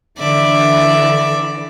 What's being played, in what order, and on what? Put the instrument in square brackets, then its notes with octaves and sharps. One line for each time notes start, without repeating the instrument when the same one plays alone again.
[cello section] D3 E3 [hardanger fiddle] D5 E5